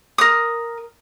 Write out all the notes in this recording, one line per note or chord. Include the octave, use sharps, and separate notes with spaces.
A#4 D#6